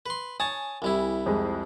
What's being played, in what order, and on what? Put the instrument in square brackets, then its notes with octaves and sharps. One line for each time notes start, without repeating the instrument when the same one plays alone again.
[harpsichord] B4 C6
[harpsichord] C#5 A5 D#6 [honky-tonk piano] G#5
[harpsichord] C2 G3 E4
[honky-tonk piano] F2 G#3